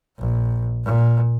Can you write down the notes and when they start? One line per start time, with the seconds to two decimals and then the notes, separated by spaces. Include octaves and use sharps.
0.18 A#1
0.85 A#2